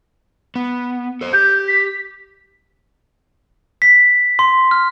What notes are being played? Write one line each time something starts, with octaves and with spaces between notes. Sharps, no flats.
B3
A4 C5
G4 G6
B6
B6
C6
F6